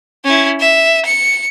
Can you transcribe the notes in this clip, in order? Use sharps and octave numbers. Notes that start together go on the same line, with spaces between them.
C#4 E4
E5
C#7